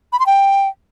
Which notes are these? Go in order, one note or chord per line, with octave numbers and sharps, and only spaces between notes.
B5
C6
G5